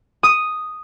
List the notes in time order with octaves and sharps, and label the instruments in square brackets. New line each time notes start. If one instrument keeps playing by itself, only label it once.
[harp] D#6